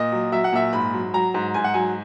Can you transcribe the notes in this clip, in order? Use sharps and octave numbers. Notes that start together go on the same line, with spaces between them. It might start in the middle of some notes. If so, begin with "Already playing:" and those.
Already playing: A#2 D#5
F#3
F#3 E5
F#5
A#2 E5
G#2 B5
F#3
F#3 A#5
G#2
G#2 G#5
F#5
F#3 G#5